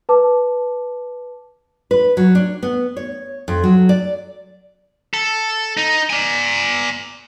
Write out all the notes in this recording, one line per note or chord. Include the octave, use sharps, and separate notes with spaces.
B4 A5 D6
B4
F#3
D4
B3
C#5
F2
F#3
D5
A4
D#4
D5 G#5